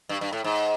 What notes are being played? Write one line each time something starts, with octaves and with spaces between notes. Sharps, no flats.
G2
G2
A2
G#2